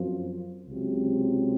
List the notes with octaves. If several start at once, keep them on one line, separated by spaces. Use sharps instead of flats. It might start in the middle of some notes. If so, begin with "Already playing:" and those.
Already playing: F#2 F3 C4 F4
C#2 C3 F#3 C4